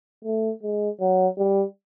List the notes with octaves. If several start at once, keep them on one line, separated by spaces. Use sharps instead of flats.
A3
G#3
F#3
G3